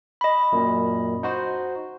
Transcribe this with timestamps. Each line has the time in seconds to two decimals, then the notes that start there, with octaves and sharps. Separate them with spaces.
0.21 D#5 B5
0.52 F#2 A#2
1.23 D#4 F#4 C5